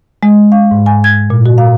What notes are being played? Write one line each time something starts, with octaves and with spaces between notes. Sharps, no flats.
G#3
F5
G#2
G#5
G#6
A#2
F#4
F5